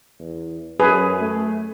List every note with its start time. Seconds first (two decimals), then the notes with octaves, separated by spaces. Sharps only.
0.19 E2
0.80 F#2 G#4 B4
1.21 A3